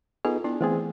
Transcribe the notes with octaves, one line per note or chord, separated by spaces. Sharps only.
B3 D#4 F4 G#4 A4
B3 D4 E4
E3 A3 B3 C4 G#4